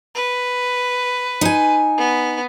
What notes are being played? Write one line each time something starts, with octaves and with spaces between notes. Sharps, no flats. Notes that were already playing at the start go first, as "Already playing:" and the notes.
B4
D#4 G#5
B3